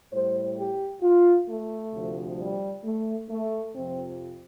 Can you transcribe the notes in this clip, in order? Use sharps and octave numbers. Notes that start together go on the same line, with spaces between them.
A2 G3 C5
G4
F4
A3
D2 C3 F3
G3
A3
A3
F2 C3 F3 C4